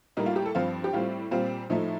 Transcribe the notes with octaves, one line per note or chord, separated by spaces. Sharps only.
A2 G3 A#3 D#4
F4
G4
A4
G2 F3 C4 F4
G4
A2 G3 C4 F4
A#2 G3 C4 F4
A2 F3 A3 D#4